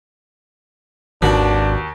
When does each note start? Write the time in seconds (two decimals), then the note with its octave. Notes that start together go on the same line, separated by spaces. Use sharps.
1.22 G#1 D#2 B3 D4 F#4